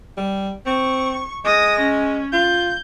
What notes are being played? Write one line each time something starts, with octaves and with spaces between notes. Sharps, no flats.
G3
C4 C#6
G#3 D#6 A#6
C#4
F4 G6